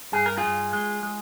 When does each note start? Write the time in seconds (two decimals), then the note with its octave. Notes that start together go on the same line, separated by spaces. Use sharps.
0.12 G2 G#4
0.26 A#4
0.38 F4 G#4
0.43 G2
0.73 G#3
1.03 G#3